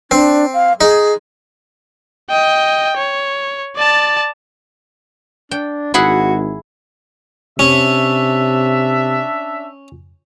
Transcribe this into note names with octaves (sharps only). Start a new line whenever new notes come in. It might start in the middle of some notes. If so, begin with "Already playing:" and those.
C4 D4
F5
D#4 G#4
D#5 G5
C#5
D5 A5
D4 G5
G#1 E4 F#4 G#4 F#5
C3 C#4 D4 E5